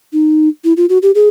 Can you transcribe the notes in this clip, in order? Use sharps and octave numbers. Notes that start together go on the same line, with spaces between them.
D#4
E4
F4
F#4
G4
G#4